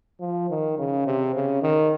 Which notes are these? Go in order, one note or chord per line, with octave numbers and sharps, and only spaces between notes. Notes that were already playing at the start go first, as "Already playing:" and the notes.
F3
D#3
C#3
C3
C#3
D#3